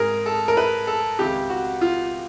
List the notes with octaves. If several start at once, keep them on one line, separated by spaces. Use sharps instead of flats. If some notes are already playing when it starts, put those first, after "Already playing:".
Already playing: G#2 G#4 A#4
A4
A#4
B4
A4
C#2 C3 D#3 G4
F#4
F4